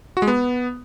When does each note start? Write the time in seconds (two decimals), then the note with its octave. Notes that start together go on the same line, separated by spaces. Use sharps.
0.17 F#4
0.22 G#3
0.28 B3